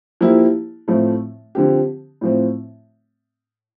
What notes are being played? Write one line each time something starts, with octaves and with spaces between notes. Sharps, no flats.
F3 A#3 E4 G4
A2 F3 A3 C4
D3 F3 C4 G4
A2 F3 C4